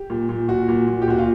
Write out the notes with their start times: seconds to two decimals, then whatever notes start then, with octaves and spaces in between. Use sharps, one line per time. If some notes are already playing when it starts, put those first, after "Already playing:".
Already playing: G4
0.10 A#2
0.29 A#2
0.48 A#2 F#4
0.68 A#2
0.88 A#2
1.02 G4
1.08 A#2 F#4
1.18 F4